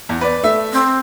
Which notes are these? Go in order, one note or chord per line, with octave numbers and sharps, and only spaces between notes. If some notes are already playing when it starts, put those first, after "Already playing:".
E2
B4 D5
A3 E5
C4